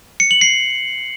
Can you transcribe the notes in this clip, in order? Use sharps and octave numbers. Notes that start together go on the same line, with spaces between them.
C#7
F#7
C7